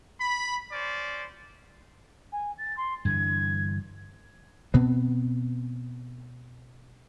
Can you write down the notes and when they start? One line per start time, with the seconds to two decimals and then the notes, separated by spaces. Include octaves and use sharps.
0.20 B5
0.72 C#4 C5 D5
2.32 G#5
2.57 A6
2.77 C6
3.05 G2 D3 E3 G#6
4.74 B2 B3 C4